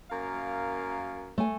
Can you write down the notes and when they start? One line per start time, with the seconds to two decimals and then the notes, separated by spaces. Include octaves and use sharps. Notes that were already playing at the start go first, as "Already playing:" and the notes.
0.10 F#2 A#3 F5
1.38 A3 G#5